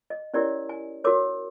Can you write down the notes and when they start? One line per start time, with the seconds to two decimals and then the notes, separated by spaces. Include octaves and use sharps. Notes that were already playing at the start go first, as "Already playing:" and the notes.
0.10 D#5
0.34 C#4 E4 G4 A#4 C#5 D5
0.69 G#5
1.04 F#4 A#4 C#5 D6